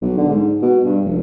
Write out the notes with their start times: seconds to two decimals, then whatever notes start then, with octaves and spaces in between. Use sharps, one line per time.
0.02 B1
0.18 D3
0.29 G#2
0.62 B2
0.84 G2
1.04 F1